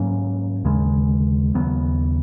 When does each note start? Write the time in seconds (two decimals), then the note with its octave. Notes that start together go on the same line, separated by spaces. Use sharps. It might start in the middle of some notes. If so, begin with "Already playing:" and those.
Already playing: G#2 F#3 A#3 C#4
0.65 D#2 C#3 G#3
1.54 D#2 C#3 F#3 B3